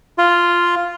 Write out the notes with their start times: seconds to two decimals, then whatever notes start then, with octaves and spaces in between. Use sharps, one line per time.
0.18 F4